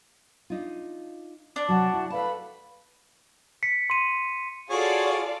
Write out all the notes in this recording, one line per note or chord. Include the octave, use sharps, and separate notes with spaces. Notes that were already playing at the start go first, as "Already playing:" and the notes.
D4 D#4 F4
D4 D5
C3 F#3 F#4 F#5 A5
E4
A4 B4 F5 A5 B5
B6 C#7
C6 D#7
F4 F#4 G#4 A4 C#5 D5